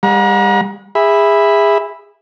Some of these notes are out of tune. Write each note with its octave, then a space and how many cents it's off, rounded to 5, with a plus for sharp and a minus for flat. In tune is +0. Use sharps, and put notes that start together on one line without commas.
G3 +30 F#5 -35 A#5 +35
G#4 -25 E5 +0 B5 +0